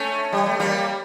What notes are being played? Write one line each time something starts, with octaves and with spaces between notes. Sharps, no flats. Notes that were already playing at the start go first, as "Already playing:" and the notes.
Already playing: A3 C#4
G3
A3
G3 A#3